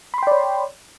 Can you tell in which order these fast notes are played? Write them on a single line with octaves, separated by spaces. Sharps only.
B5 C6 G5 D5 C#5